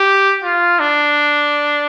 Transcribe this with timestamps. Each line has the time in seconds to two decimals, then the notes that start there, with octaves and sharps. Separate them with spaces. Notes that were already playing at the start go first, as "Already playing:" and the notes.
Already playing: G4
0.43 F4
0.80 D4